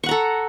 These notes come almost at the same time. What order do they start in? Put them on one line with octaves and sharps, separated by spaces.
C#6 F#5 A#5 A4